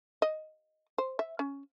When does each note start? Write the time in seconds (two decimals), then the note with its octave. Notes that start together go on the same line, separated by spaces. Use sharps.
0.22 D#5
0.98 C5
1.19 E5
1.39 C#4